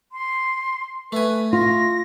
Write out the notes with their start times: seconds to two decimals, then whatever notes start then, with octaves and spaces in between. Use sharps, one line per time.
0.12 C6
1.12 A3 B4 G#5
1.53 F4 A#6